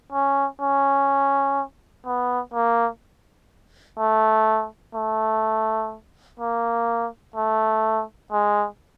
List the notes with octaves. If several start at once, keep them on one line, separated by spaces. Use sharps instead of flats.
C#4
C#4
B3
A#3
A3
A3
A#3
A3
G#3